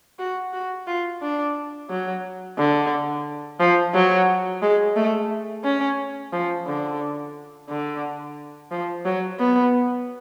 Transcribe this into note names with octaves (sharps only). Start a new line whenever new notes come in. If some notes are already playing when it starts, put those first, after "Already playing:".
F#4
F#4
F4
D4
F#3
D3
F3
F#3
G#3
A3
C#4
F3
D3
D3
F3
F#3
B3